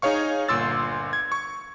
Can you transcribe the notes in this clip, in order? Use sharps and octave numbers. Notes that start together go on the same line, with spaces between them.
D#4 G#4 C#5 F5 C#6
G1 A#2 C6 E6 A6
G#6
C#6